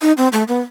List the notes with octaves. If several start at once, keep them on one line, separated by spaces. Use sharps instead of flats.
D#4
C4
A3
B3